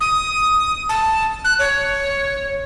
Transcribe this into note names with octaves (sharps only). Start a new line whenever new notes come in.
D#6
A5
F#6
C#5